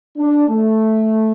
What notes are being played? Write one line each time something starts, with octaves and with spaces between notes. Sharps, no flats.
D4
A3